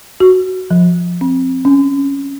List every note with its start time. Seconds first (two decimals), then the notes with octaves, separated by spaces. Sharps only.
0.20 F#4
0.70 F3
1.21 C4
1.65 C#4